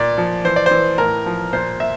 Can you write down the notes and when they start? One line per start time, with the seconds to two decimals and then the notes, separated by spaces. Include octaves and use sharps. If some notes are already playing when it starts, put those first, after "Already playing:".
Already playing: A#2 D5
0.18 F3
0.44 E3 C5
0.56 D5
0.66 E3 C5
0.98 A2 A#4
1.26 F3
1.53 A#2 C5
1.80 A#2 E5